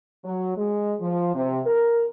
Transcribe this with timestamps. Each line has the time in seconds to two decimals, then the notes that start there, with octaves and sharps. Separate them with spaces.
0.24 F#3
0.56 G#3
1.01 F3
1.35 C3
1.66 A#4